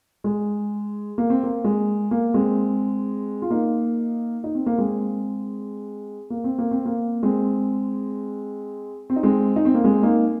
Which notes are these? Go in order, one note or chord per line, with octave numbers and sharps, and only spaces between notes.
G#3
A#3
C4
A#3
G#3
A#3
G#3 C4
F4
A#3 D#4
D#4
C4
A#3
G#3 C4
A#3
C4
A#3
C4
A#3
G#3 C4
C4
D#4
G#3 C4
D#4
C4
A#3
G#3 C4
A#3 D#4